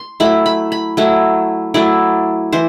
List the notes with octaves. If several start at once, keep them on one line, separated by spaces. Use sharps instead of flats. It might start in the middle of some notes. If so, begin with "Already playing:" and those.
Already playing: C6
F#3 A3 E4 B5
B5
B5
F#3 A3 E4
F#3 A3 E4 D5
E3 C5